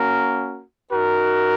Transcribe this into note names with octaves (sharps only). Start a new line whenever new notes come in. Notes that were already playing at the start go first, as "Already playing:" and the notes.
Already playing: A#3 C#4 F#4 A#4
D#4 F#4 A#4